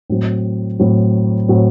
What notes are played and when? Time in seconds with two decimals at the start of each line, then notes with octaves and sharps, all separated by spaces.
0.10 A2 F#3 C4
0.79 A2 F#3 C4
1.48 A2 F#3 C4